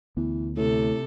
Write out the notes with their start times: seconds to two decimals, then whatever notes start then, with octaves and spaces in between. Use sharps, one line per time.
0.17 D2 E3 B3
0.57 A2 C3 A4